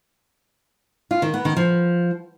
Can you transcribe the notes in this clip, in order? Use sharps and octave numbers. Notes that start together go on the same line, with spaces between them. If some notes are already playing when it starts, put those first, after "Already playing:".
F4
D#3
B3
D#3
F3